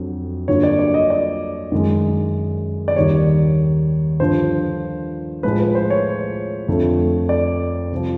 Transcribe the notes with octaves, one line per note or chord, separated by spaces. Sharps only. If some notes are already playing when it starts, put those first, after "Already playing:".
Already playing: F2 D3 F#3
G2 D3 F#3 A#3 C#5
D5
D5
D#5
D5
F#2 D#3 G#3
D5
D#2 D#3 G3 C#5
G2 D3 F3 C5
A2 F3 G#3 B4
B4
C5
C#5
F2 D3 F3 A3
D5
C2 C3 F3